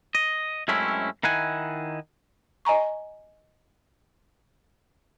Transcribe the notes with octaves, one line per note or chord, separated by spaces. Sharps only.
D#5
F#2 G#3 A3 C4 C#4 E4
D#3 D#4 E4 F#5 G#5
D#5 G#5 A#5 C#6